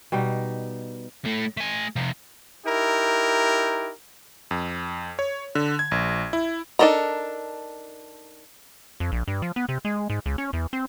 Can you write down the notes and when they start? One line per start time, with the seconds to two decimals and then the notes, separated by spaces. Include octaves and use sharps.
0.12 B2 G3 D#4
1.25 A2 A3
1.57 A3 G#5
1.96 C3 F3
2.66 D#4 E4 G4 A#4
4.51 F2
5.19 C#5
5.55 D3
5.79 G#6
5.91 A#1
6.33 E4
6.79 D4 D#4 A4 A#4 A#5
9.00 F2
9.12 A#1
9.28 G2
9.42 F3
9.56 B3
9.69 C3
9.85 G#3
10.10 G#2
10.26 C#2
10.38 C#4
10.53 E2
10.73 C4